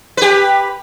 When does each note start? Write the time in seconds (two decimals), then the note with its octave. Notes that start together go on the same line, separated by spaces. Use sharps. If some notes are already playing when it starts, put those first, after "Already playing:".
0.17 G4 B4